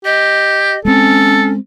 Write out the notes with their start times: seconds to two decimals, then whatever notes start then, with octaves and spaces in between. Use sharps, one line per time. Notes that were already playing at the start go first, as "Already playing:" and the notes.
0.05 G4 D#5
0.85 G#3 C4 C#4 A4